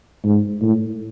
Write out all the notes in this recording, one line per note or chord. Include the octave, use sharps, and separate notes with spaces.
G#2
A2